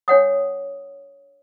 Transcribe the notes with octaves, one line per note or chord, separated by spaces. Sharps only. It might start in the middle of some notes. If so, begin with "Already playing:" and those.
D4 C#5 F#5 D#6